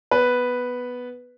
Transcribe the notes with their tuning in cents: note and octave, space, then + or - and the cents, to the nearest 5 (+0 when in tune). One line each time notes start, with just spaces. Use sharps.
B3 +0 B4 +0